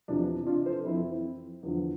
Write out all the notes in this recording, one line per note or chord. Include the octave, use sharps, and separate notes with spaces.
E2 C3 F3 D4
D4 F4
A4 C5
F2 E3 C4 E4
E2 D3 F3